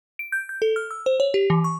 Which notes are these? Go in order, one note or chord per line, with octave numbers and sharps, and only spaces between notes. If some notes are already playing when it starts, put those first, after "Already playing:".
D7
G6
G6
A4
F6
E6
C5
C#5
G4
E3
C#6